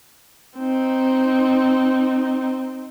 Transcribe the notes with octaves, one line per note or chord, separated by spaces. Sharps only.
C4 D#4